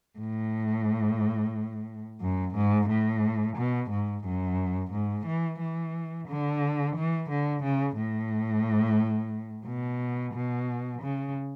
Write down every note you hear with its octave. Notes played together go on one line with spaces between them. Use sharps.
A2
F#2
G#2
A2
B2
G#2
F#2
G#2
E3
E3
D3
E3
D3
C#3
A2
B2
B2
C#3